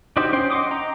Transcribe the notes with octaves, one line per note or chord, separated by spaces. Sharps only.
D4 D#4 F#4 G4 C5
C#4 C5 G5 C6
D#5 F#5 C6 D6 D#6
D#5 G5 A#5